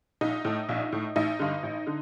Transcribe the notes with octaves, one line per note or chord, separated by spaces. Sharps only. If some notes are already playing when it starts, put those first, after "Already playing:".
A#1 D#4
A2
A#1
A2
A1 D#4
G2 D3
A1
D3